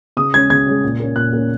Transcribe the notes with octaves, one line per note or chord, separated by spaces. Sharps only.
C#3 D#6
G#3 C#4 G#6
C#3 G#6
G#3 C#4
A#2
A#3 C#4
A#2 F#6
A#3 C#4